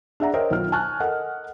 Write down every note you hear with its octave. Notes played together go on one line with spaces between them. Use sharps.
D4 G#4 E5 F#5 A#5
A#4 C5 C#5 D#5 E5 G5
B1 D#3 F4 F6
G#5 A5 C#6 F6 F#6
A4 A#4 D#5 F#5